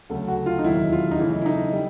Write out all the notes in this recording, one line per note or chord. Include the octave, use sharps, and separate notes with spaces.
D2 C#3 F#3 A3 A4
F#4
F4
D#4
E1 D#2 D#3 F#3 E4
F4
D#4
F#2 C#3 E3 A3 E4
E4
D#4
G3